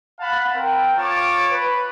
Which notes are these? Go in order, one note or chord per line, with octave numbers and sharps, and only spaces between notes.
F5 F#5 A5 B5
C4 A#4
F4 C#5 A5 D6
B4